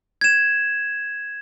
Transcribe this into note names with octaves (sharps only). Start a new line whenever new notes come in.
G#6 E7